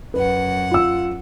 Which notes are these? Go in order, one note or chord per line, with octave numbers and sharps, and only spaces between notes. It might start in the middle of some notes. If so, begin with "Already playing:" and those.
F#2 B4 F#5
F4 E6